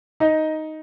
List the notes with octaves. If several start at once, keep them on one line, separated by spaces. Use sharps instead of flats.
D#4 D#5